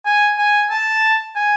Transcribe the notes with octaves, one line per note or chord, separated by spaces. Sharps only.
G#5
G#5
A5
G#5